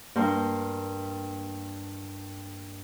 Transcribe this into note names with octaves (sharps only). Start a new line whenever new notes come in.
G2 A#3 C6